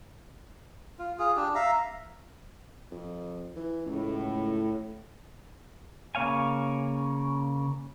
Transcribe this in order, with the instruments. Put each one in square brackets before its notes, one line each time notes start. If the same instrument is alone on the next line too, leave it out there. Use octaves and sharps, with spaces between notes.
[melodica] F4
F4 G#4
D4 G4
E5 F5 A#5
[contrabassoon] F2
E3
[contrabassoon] C#2 [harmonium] A2
[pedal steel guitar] C#3 A#3 C#5 F5 G#5